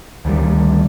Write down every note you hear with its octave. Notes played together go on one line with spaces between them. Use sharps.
D2 D#3 G3